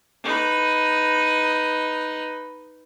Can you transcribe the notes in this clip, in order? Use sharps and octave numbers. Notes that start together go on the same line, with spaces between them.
D#4 B4